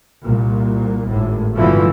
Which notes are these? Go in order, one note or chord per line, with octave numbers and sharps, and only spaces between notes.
C2 A#2
G#1 A2
G1 B2 E3 F3 A3